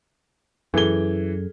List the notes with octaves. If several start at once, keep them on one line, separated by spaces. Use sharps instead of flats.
F#2 E3 G#4 A4 G#6 G7